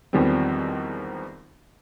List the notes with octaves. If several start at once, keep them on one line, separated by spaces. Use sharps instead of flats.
E2 D#3 F3 G3 G#3 C4